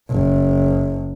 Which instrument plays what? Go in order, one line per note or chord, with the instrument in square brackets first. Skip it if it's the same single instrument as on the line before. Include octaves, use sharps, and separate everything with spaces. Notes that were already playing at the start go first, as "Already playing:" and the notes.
[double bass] F#1